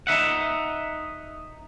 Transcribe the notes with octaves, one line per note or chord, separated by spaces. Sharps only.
D#4 E5 F#5